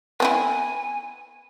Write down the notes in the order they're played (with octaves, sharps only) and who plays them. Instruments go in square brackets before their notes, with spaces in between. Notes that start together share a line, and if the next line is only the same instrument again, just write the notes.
[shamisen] B3 C4 E4 [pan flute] G#5